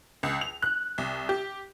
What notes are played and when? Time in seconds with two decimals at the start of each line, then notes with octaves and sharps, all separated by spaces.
0.23 C#2
0.41 F7
0.62 F#6
0.98 C2
1.29 G4